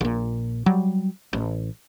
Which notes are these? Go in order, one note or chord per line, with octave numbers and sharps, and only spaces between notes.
A#1 A#2
F#3 G3
A1